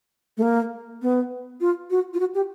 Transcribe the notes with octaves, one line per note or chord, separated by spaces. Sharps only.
A3
A#3
B3
F4
F#4
F4
F#4
G4